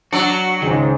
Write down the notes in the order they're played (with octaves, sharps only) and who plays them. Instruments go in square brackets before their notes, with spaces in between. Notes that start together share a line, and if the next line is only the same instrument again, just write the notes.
[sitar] F#3 D4 [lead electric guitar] F#4
[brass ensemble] C#2 G#2 [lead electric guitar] D#3